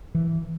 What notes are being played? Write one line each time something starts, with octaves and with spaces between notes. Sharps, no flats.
E3